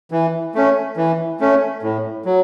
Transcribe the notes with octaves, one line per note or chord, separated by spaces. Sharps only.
E3
A3 C#4
E3
A3 C#4
A2
F#3